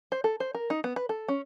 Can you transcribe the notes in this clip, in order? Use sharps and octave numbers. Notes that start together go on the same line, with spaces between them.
C5
A4
C5
A#4
D#4
B3
B4
A4
C#4